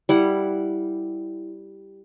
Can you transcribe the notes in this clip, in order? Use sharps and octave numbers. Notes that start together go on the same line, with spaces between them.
G3 E4 F#5